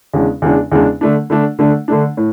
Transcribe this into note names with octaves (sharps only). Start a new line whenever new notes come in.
E2 C#3 G#3 D4
E2 C#3 G#3 D4
E2 C#3 G#3 D4
D3 A3 D4
D3 A3 D4
D3 A3 D4
D3 A3 D4
A2